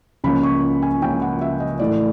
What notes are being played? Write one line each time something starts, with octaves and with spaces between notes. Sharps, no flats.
C#2 C#3 F3 A#3 C#4 B5
C#6
G#5
C#2 C#3 F3 A#3 C#4 G5
F#5
E5
D#5
A2 E3 A3 D5